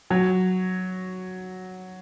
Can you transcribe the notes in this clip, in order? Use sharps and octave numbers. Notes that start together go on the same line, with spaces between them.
F#3